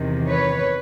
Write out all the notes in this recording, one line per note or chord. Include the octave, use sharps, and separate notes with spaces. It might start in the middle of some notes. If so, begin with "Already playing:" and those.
Already playing: E2 C3 D#3
B4 C#5